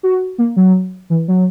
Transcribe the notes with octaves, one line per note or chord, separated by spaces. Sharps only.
F#4
A#3
F#3
E3
F#3